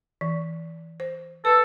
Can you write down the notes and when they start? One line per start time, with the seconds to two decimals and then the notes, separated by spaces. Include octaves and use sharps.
0.21 E3
1.00 C5
1.45 A4 B4